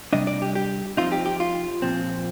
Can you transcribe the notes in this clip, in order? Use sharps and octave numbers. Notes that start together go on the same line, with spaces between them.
C3 G3 D4 D#5
D5
G4
G4
F3 C4 D#4 F4
G4
G4
F4
A#2 F3 C4